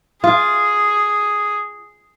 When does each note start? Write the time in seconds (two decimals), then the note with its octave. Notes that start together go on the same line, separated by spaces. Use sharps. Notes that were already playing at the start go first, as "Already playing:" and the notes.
0.24 F4 G#4